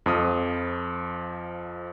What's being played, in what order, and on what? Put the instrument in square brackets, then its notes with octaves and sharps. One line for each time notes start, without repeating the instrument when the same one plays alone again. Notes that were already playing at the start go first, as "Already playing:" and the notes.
[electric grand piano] F2 F3 D#6